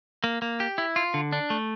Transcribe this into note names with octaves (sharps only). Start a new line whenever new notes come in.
A#3
A#3
G4
E4
F4
D3
D4
A3